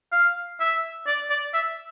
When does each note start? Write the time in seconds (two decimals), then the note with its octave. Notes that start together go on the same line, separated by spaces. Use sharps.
0.12 F5
0.60 E5
1.07 D5
1.30 D5
1.54 E5